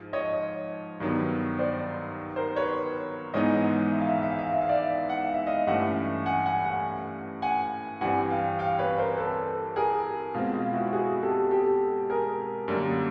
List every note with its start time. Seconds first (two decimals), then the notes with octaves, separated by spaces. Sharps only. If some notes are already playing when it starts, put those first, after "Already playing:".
Already playing: G#2 F3
0.13 C#5 D#5
1.00 G2 D#3 F#3 B3
1.59 C5 D5
2.36 A#4 C5
2.56 B4 C#5
3.34 G#2 E3 G#3 B3 D#4 C#5 D#5
3.92 E5
4.00 F5
4.07 E5
4.16 F5
4.23 E5
4.30 F5
4.39 E5
4.46 F5
4.54 E5
4.61 F5
4.69 D5 E5
5.09 F#5
5.22 F5
5.34 E5
5.46 D#5 F5
5.67 G2 E3 A3 C#4 E5 F#5
6.26 F#5 G#5
6.46 F#5 G#5
6.65 F#5 G#5
7.42 F#5 G#5
8.01 G2 E3 G3 C4 F#5 G#5
8.30 F5 G5
8.59 F5 G5
8.79 B4 C#5
8.98 A#4 C5
9.17 A4 B4
9.76 G#4 A#4
10.34 B2 G#3 C4 F4
10.53 F4
10.73 E4 F#4
10.92 F#4 G#4
11.22 G4 A4
11.51 G4 A4
12.09 G#4 A#4
12.68 F#2 D3 G3 A#3